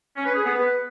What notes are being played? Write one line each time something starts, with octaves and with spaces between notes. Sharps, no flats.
C#4
B4
G#4
B3
B4